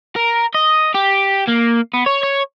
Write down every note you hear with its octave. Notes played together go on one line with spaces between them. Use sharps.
A#4
D#5
G4
A#3
B3
C#5
C#5